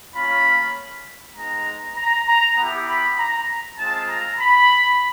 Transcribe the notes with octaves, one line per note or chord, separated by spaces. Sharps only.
A#3 C#4 F4 B5
G#3 B3 D#4 A#5
A#5
A#5
B3 E4 G4
B5
A#5
G#3 C4 F4 A5
A#5
B5